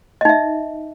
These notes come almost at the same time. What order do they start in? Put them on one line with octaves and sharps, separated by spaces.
D#5 D#4 E5